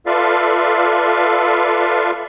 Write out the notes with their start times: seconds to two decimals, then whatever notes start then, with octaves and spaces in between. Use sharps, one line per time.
0.06 F4 A4 B4 D5 E5 F5